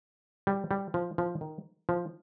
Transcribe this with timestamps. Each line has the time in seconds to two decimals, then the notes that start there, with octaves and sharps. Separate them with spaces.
0.47 G3
0.71 G3
0.94 F3
1.18 F3
1.41 D#3
1.89 F3